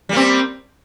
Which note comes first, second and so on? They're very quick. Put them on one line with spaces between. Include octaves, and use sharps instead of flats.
G3 A#3 C4